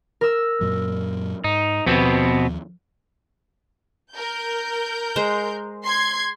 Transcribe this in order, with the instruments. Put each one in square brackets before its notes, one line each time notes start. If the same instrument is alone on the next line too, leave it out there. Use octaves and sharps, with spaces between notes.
[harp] A#4 E6
[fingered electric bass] F#2 A#2 F#3
[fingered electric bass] G#2 [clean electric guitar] D#4
[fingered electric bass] D#2 F3 [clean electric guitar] B2 B3 C4
[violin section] A#4 G6
[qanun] G#3 C5 A#5
[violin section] C6 G#6